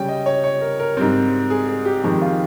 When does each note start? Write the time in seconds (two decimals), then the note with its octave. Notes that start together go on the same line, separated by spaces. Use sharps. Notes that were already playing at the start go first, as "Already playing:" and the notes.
Already playing: C#3 G3 C#4 G5
0.08 D#5
0.26 C#5
0.44 C#5
0.61 A#4
0.79 A#4
0.97 G#2 G3 C4
1.50 G#4
1.68 G#4
1.85 G4
2.04 F2 D#3 G#3 G4
2.22 F4